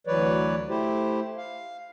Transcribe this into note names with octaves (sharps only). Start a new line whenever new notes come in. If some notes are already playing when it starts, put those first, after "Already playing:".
D2 E3 F#3 B4 C#5 D5
A3 E4 G4 C5
F5